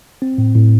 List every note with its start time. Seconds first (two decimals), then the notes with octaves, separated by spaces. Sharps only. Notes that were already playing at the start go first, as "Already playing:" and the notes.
0.22 C4
0.38 A2
0.55 A2